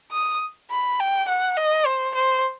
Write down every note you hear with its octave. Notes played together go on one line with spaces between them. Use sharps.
D#6
B5
G5
F#5
D#5
C5
C5